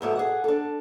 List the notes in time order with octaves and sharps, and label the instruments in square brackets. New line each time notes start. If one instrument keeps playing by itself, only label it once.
[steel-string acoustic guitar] E2 G#2 B2 A3
G#4 D5 F#5
D4 A4